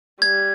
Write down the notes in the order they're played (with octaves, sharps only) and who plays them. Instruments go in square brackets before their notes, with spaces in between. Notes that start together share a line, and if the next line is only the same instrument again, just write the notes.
[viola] G3 [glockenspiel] G#6